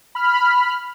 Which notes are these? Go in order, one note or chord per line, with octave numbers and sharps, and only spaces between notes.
B5 F6